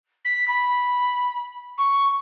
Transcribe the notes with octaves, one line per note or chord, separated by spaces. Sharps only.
B6
B5
C#6